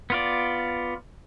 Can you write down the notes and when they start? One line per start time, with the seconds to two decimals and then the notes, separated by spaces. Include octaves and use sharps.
0.10 B3 F4 D5